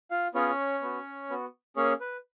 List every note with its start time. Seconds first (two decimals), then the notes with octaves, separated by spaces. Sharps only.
0.11 F4 F5
0.34 B3 C#4 F4 G#4 C#5
0.81 B3 F#4
1.30 B3 F#4
1.76 A#3 C#4 G#4 C#5
2.01 B4